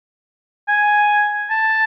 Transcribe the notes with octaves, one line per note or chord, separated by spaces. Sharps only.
G#5
A5